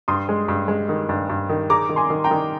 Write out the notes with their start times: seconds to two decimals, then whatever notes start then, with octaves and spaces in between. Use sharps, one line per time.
0.08 G2 C6 D#6
0.29 G#3
0.48 G2
0.68 G#3
0.89 D#3
1.09 G2
1.30 G2
1.49 D#3
1.70 G#4 A#5 D6
1.89 D#3
1.96 G#5 C6
2.10 D#3
2.24 G5 A#5
2.31 D#3